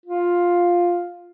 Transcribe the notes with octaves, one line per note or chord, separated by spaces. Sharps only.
F4